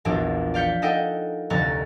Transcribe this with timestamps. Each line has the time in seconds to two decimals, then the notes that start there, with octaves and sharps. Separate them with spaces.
0.05 A#1 E2 A#2 D4 F#4 D6
0.54 D5 F5 G6 B6 C#7
0.82 D#4 A4 D#5 F#5 G5
1.50 F1 D2 A#5 C#6 F#6 A6